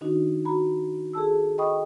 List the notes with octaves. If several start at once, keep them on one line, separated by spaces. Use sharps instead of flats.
D#3 D4 D#4 F#4
F#4 A#5 B5
G#4 A4 A5 E6
D#5 G5 B5 C#6 D#6